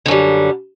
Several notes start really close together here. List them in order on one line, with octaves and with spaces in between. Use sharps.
D3 F#2 G3